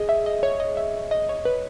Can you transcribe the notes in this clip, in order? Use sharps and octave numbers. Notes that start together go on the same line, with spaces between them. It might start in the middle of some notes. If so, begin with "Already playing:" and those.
Already playing: G#4 D#5
E5
D#5
C#5
D#5
E5
D#5
C#5
B4